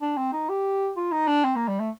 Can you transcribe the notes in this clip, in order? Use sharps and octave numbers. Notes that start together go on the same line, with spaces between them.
D4
C4
D#4
G4
F4
D#4
D4
C4
A#3
G3
A3